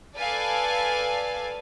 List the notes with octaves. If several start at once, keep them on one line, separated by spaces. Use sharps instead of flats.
A4 B4 D5 F5 G#5